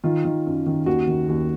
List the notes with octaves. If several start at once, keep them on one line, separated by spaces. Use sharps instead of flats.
D#3 F4
D#3
F#2
D#3
D#2 F#4
D#3
D#2